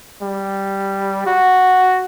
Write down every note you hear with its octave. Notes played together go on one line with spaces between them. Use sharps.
G3
F#4